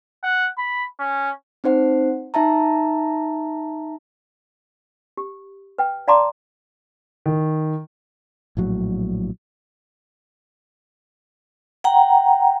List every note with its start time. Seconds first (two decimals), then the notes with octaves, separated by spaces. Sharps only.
0.23 F#5
0.57 B5
0.99 C#4
1.64 C4 D#4 C5 F#5
2.34 D#4 E5 A5 A#5
5.17 G4
5.78 B4 G5
6.08 D5 F5 A5 A#5 C6 D6
7.26 D#3
8.57 A#1 A2 F#3
11.84 F#5 G5 A#5